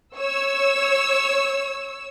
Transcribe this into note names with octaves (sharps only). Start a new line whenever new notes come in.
C#5 E6